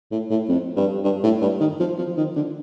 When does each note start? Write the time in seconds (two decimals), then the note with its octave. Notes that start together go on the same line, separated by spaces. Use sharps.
0.12 A2
0.30 A2
0.48 F2
0.76 G2
1.04 G2
1.23 A2
1.42 G2
1.60 D#3
1.80 F3
1.98 F3
2.17 D#3
2.36 D3